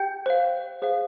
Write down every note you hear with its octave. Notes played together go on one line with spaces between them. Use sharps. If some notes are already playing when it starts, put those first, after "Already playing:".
Already playing: G4 G5 G6
C5 F5
G#4 C5 F5